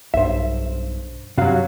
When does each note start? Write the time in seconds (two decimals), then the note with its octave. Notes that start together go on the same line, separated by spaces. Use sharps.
0.14 B1 G2 C5 E5
1.38 G2 C3 F#3 F#4 F5